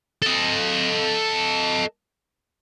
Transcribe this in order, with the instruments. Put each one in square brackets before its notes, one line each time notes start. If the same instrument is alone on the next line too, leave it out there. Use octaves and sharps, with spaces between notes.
[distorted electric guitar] A4 D#5